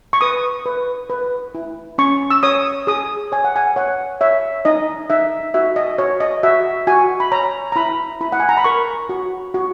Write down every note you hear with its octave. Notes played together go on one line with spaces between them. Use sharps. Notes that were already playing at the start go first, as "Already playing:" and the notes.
C#6
B4 D#6
B4
B4
E4
C#4 C#6
E6
C#5 D#6
G#4 D#6
C#5 G#5
F#5
G#5
C#5 F#5
C#5 E5
D#4 D#5
D#4 E5
F#4 E5
D#5
F#4 C#5
D#5
F#4 E5
F#4 G#5
B5
C#5 A#5
A#5
E4 B5
E4 B5
F#5
G#5
A#5
B5
A#4 C#6
F#4
F#4